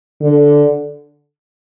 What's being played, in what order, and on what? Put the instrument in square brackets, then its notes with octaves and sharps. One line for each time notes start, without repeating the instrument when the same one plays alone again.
[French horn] D3